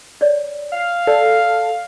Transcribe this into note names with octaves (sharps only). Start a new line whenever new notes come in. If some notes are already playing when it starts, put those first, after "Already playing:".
C#5 D5
F5
A4 D5